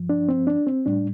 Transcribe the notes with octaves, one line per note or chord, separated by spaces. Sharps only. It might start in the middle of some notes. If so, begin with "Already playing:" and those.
Already playing: G2 F3
D4
C4
D4
C4
A2 G3 D4